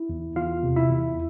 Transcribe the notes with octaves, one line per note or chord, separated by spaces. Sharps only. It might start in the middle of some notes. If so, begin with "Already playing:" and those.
Already playing: E4
E2
E2 F4 F5
C3
E4 E5
E2